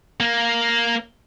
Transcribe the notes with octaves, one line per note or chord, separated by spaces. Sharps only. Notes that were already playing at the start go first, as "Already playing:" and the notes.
A#3